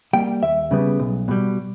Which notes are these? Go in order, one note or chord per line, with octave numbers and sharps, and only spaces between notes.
G3 A#3 G5
D#2 E5
C#3 G3 B3
B1
B2 G3